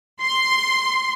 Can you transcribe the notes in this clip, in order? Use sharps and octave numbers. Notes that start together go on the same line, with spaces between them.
C6